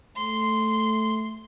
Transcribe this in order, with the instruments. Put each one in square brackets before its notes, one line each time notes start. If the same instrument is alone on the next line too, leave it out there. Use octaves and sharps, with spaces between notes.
[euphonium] A3 [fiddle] C6